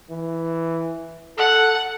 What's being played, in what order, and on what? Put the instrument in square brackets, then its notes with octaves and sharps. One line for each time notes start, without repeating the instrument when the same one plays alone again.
[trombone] E3
[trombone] A4 [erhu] F#5